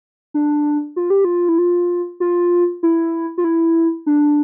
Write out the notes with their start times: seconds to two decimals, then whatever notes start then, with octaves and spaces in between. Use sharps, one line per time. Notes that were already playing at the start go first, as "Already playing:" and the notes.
0.34 D4
0.96 F4
1.10 G4
1.25 F4
1.49 E4
1.58 F4
2.20 F4
2.83 E4
3.38 F4
3.44 E4
4.06 D4